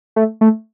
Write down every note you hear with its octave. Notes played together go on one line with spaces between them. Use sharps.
A3
A3